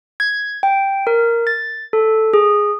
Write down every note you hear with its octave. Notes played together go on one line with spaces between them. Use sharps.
G#6
G5
A#4
A6
A4
G#4